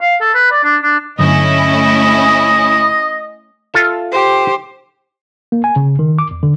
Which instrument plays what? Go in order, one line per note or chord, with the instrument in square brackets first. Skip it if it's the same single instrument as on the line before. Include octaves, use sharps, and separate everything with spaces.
[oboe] F5
A4
B4
D5
D4
D4
[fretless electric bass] G2 D3 F#3 [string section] A3 C#4 E4 [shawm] D#5
[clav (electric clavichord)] F4 A4 E5
[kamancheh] G4 C5
[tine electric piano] A#3
G#5
C#3
D#3
D6
E2
D3